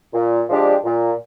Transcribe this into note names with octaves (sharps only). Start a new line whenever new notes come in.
A#2
F3 G#3 D4 G4
A#2